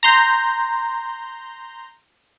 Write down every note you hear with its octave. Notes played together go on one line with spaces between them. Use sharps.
A#5 C6 G6